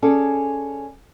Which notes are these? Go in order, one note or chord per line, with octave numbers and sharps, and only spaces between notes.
C#4 G#4 A4 C#5 D5